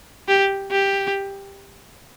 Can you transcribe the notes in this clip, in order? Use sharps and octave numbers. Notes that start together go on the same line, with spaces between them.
G4
G4